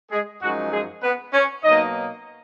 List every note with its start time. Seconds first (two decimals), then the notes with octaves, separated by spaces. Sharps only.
0.11 G#3 G#4
0.42 F#2 F3 G#3 D#4 F#4
0.72 G#3 G#4
1.03 B3 B4
1.34 C#4 C#5
1.64 B2 F#3 A#3 D#4 D#5